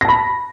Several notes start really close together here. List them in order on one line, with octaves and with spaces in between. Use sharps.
A#6 A5 B5